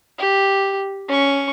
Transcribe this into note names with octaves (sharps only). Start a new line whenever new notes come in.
G4
C#4 C#6